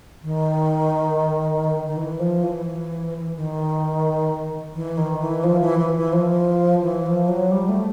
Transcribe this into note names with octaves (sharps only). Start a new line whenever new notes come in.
D#3
D#3
E3
F3
E3
D#3
E3
D#3
E3
F3
E3
E3
E3
F3
E3
F3
F#3
G3
A3